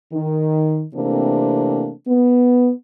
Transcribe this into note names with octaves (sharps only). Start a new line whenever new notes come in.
D#3
C3 E3 A3 A#3 C4 D4
B3